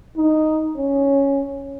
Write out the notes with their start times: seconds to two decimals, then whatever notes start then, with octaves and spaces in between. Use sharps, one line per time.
0.17 D#4
0.77 C#4